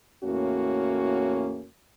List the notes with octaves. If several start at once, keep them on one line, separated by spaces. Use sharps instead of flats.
E2 A2 A#3 C#4 F#4